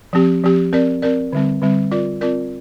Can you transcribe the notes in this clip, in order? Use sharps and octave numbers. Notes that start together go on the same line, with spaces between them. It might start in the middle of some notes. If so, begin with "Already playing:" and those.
F3 C4 G4
F3 C4 G4
C4 A#4 D5
C4 A#4 D5
D3 G3 C4
D3 G3 C4
C4 F4 A#4 D5
C4 F4 A#4 D5